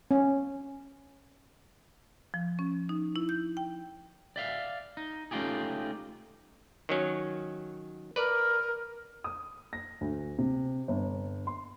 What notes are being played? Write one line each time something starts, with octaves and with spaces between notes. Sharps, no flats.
C#4
F3
C#4
D#4
E4
G6
G5
D5 E5 F5
D#4
A3 C#4 D#4 F4 G4 G#4
D#3 F#3 C#4
A#4 B4 D5
D#6
A#6
D2
C3
G1
C6